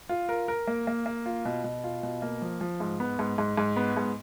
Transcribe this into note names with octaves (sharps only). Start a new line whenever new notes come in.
F4
A#4
A#4
A#3
A#3
A#3
F4
B2
B2
F4
B2
A#3
F3
F3
G#2
B3
G#2
G#2
G#2
B3
G#2